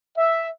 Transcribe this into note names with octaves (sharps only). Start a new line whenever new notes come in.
E5